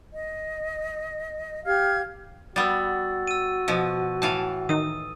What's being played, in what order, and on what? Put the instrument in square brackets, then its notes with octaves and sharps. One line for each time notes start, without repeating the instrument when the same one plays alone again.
[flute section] D#5
G4 F5 F6 G#6
[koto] G3 B3 [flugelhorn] F#4 [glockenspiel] E6 A6
[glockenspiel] E6 D#7
[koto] B2 F3
[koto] A2 E3 F5 [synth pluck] A5
[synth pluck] D#3 D#4 [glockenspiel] D#6 D#7